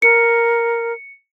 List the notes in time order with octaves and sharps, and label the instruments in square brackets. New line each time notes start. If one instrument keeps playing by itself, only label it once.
[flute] A#4 [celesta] C#7